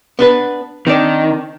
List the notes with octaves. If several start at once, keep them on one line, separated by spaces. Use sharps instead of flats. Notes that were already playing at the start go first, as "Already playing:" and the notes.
B3 D4 B4
D#3 C4 D4 D5